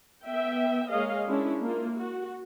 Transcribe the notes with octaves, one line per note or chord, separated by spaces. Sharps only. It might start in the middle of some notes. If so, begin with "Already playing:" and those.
B3 E5 G5
G#3 A#3 G#4 C#5 D#5 F5
G#3 C#4 D4 E4
A#3 E4 F4
F#4